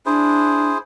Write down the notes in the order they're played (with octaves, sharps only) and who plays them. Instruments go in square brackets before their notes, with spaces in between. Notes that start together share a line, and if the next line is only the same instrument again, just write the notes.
[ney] D4 [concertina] E4 G#4 C5